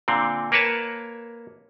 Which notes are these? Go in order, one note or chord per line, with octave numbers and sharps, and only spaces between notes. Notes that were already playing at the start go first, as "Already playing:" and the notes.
A#2 D3 C4
A#3 A#4 B4 C#5 A5